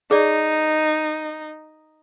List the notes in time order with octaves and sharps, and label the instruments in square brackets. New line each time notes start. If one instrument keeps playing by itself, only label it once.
[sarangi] D#4 [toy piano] G#4 D5